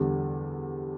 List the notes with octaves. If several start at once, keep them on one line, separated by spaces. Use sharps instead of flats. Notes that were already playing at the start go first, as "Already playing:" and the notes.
Already playing: E2 D3 G3